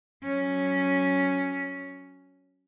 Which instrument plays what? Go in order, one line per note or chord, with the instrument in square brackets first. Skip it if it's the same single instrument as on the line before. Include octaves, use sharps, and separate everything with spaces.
[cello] F#3 C#4